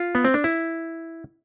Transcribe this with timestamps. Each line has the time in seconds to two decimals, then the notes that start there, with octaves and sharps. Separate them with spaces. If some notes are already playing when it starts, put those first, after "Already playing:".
Already playing: F4
0.15 B3
0.25 C4
0.34 D4
0.44 E4